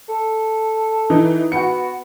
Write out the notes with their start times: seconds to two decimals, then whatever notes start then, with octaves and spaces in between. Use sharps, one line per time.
0.09 A4
1.10 E3 D#4
1.52 B3 F#4 C#7